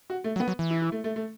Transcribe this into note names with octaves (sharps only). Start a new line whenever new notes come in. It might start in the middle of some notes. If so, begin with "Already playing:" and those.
F#4
A3
F#3
B3
F#3
E3
E4
E4
A3
A3
A3